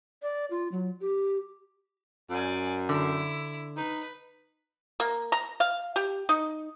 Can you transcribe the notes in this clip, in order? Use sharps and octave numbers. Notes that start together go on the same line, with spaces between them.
D5
F4
F#3
G4
F#2 D5 G#5
D3 E4
D#4 B4
A#3
A#5
F5
G4
D#4